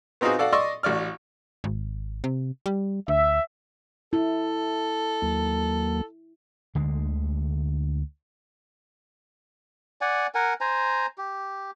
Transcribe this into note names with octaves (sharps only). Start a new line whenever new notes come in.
B3 C4 D#4 F4 F#4 G#4
F#4 A4 D5 F5 F#5
D5 D#5 C6 C#6 E6
A1 F#4 D5 F6
G#1
C3
G3
D2 E5
E4 A4
D#2 F#3 A#3
D2 D3 G#3
D5 F#5 G#5
A#4 F#5 G#5
C5 G#5 A#5
G4